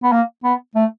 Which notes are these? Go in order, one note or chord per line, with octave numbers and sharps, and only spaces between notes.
B3
A#3
B3
A3